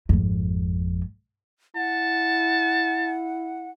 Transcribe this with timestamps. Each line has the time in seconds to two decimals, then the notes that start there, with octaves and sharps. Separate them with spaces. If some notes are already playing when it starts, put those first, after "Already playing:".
0.09 G#1 F2
1.76 E4 F#5 A5